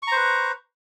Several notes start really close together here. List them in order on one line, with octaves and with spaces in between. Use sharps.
C#6 A#5 C5 B4